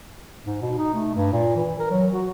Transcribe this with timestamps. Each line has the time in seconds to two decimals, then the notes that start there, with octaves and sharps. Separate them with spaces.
0.45 G#2
0.62 B2
0.78 D#4
0.94 A3
1.15 G2
1.32 A#2
1.56 E3
1.79 A#4
1.90 F#3
2.13 F#4